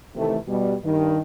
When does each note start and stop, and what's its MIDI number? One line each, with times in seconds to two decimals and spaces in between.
0.16 0.37 48
0.16 0.37 51
0.16 0.37 52
0.16 0.37 57
0.48 0.74 47
0.48 0.74 55
0.84 1.19 43
0.84 1.19 51